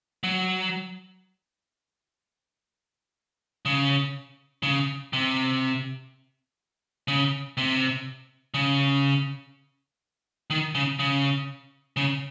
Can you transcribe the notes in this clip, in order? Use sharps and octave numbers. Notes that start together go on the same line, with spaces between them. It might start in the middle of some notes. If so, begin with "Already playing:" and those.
F#3
C#3
C#3
C3
C#3
C3
C#3
D#3
C#3
C#3
C#3